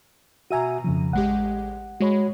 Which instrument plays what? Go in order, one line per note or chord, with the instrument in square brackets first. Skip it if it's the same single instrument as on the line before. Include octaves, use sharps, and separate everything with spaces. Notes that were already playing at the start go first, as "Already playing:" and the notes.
[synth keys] B2 A#5 D#7 [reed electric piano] F#4 E5 G#5
[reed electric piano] F2 C#3 F3
[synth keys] A1 G#3 G4 [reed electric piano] F#5
[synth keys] G#3 [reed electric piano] F#4 C#5 B5